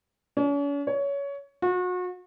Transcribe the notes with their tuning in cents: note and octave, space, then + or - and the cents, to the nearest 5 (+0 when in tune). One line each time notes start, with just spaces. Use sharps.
C#4 +45
C#5 +20
F#4 -35